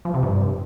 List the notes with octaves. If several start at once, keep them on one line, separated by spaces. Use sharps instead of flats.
F3
C3
G2